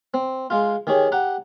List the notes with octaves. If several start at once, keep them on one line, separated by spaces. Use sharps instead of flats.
C4
G#3 F4
D#3 G4 G#4 C#5
G4 F#5 A#5